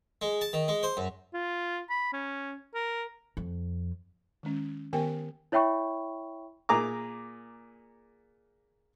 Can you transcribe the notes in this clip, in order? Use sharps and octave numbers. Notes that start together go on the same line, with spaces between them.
G#3
A5
D#3
G#3
C5
F#2
F4
B5
C#4
A#4
F2
D#3 G#3 C#4
D#3 B3 G4 A#4 G5 G#5
E4 C#5 E5 G5 B5 C#6
A#2 G#4 A#5 D6